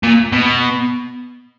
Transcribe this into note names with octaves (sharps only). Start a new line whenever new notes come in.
A#2
B2